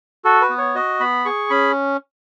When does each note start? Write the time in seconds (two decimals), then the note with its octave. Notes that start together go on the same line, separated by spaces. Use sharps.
0.25 F#4 A4
0.41 B4
0.50 B3
0.58 C#5
0.75 F#4 D#5
1.00 B3 B5
1.25 G#4 C#6
1.50 C#4 B5